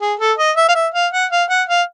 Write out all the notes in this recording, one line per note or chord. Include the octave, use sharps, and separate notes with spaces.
G#4
A4
D#5
E5
F5
E5
F5
F#5
F5
F#5
F5